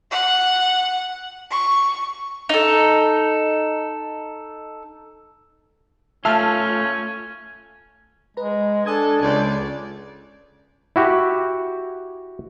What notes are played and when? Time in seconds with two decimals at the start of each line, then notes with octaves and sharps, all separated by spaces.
0.11 F#5
1.52 C#6
2.49 D#4 A4
6.25 A3 C#4 F4 E5 A5 F6
8.37 G#3 B4 A#5
8.86 D4 A4 G#5 D#6 G#6
9.22 C#2 D5 G#6
10.96 E4 F#4 G4